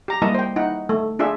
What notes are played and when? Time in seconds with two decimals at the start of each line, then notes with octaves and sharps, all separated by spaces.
0.08 G4 A#5
0.22 G3 A#3 E4 D#5 A5
0.34 C5 G5
0.56 D#4 E4 F#5
0.89 A3
1.19 D4 F4 G#4 E5